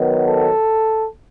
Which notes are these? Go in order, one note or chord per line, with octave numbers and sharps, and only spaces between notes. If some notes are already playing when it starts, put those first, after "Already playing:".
Already playing: D#3 F#3 B3
A4